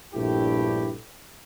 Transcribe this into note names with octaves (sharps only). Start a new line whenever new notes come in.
A#1 G2 A3 E4 G4